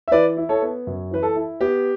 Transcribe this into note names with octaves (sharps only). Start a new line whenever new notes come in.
E5
E3 B4 D5
E4
A4 C#5
B3
F#2
E3 B4
A4
E4
B3 G4